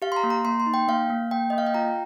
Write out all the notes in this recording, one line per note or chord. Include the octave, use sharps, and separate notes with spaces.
G4 F5
C6
A#5
A#3
A#5
A#3 C6
C6
D#4
G5
A#3 F5
A#3
A#3 G5
A#3 D#5
F5
G5
F4 A#5